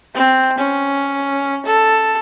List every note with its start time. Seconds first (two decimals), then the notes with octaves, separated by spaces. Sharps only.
0.15 C4
0.58 C#4
1.66 A4